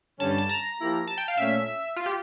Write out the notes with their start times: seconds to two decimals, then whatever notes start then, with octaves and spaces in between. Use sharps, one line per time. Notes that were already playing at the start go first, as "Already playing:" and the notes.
0.20 G2 D3 G3 C#4 A5
0.38 A5
0.49 A#5
0.79 F3 A#3 E4 G4
1.07 A5
1.18 G5
1.28 F5
1.37 A#2 A3 C#4 E5
1.96 F4
2.06 G4